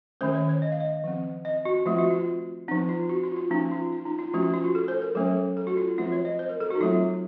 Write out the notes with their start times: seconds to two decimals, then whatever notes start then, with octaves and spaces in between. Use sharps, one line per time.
0.21 D#3 A3 C#4 C5
0.34 C#5
0.49 C#5
0.62 D#5
0.72 F5
0.80 D#5
1.04 F3 C4
1.45 D#5
1.65 F#4
1.86 F3 A3 C4 F4
1.98 F#4
2.11 F4
2.68 F3 C4 D#4
2.89 F4
3.09 F#4
3.24 F4
3.32 F#4
3.37 F4
3.50 F3 A#3 C#4 D#4
3.71 F4
3.92 F4
4.05 D#4
4.19 F4
4.34 F3 A3 C#4 F#4
4.43 F4
4.54 F4
4.64 F#4
4.75 A4
4.88 C5
5.02 A#4
5.15 F#3 A3 C#4 A4
5.57 A4
5.67 F#4
5.77 F4
5.98 F3 A3 C4 F4
6.12 C#5
6.25 D#5
6.39 C5
6.49 A#4
6.60 A4
6.70 F#4
6.75 D#4
6.81 F#3 A3 C4 F4